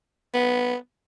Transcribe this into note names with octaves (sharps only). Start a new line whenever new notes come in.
B3